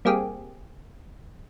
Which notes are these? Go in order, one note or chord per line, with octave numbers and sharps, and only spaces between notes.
G3 A#3 C4 G4 G#4